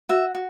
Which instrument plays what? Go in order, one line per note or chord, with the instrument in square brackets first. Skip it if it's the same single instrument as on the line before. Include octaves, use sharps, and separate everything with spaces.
[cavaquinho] F#4 E5
F#4